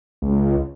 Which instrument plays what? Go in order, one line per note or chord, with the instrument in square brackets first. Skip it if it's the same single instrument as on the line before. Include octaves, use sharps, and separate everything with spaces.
[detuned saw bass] C#2